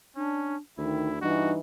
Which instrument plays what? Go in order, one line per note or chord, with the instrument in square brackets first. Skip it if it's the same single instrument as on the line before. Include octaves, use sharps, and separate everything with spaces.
[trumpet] C#4 [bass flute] D4
[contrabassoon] D2 [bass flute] D#3 [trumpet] E4
[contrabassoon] G2 [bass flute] E3 [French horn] D#4 [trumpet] F#4